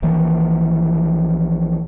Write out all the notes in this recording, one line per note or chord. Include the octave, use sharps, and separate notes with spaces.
A#1 D#3 E3 A#3